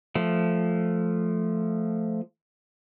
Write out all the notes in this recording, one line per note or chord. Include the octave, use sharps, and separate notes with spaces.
F3 A3